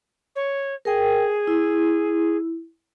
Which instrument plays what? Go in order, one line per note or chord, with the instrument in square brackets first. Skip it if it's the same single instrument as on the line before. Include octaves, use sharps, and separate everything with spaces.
[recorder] C#5
[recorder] G#4 [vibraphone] A#4 G5
[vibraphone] E4